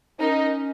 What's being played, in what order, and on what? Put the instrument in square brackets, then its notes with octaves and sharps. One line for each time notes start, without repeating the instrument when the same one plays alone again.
[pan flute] C#4 [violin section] D#4 A#4 D#5